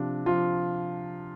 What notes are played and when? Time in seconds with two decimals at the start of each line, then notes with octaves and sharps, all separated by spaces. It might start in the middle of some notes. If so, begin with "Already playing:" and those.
Already playing: C3 F3 D4
0.26 F3 F4